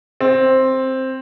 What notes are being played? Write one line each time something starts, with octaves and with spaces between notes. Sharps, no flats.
C4